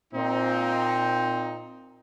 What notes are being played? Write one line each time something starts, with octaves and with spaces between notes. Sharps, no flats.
A#2 C4 D#4